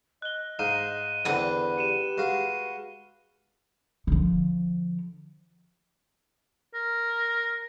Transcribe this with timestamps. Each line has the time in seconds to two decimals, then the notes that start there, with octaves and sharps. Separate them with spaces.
0.22 D#5 F#6 G7
0.59 G#2 D#4 F5 D#7 E7
1.25 E2 D3 C4 B4 F#5
1.77 G4 C#7 D#7 E7
2.18 G#3 F#4 F5
4.07 D3 F3
6.74 A#4